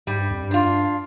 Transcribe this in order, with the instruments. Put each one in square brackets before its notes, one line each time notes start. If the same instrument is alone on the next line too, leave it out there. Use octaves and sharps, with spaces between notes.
[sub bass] G#2 [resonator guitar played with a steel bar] G3
[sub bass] G2
F2
G2
[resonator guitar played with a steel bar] D4 F4